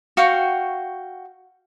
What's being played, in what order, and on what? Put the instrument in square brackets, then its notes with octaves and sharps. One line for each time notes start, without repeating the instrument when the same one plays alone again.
[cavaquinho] F#4 F5 G5 C#6